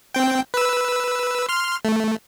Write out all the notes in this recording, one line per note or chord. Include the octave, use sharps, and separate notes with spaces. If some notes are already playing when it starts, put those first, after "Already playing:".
C4 G5
B4 E6
C6 F6
A3